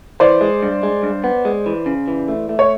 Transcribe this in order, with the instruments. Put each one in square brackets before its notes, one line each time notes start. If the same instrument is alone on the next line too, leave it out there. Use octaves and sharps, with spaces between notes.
[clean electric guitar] E3 [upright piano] C5 D5
[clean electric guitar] G#3
G2
G#3
G2
B3
G#3
E3
C#3
E3
A3
A3
[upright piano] C#5